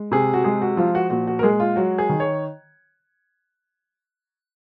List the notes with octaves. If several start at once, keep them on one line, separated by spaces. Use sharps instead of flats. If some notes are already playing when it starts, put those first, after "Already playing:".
Already playing: G#3
C3 G#4
F#4
G#3 G#4
F#4
F3 F4
F#4
A#2 F#4
F#4
A#4
G#3 G#4
F4
F#3 F#4
G#4
D#3
C#5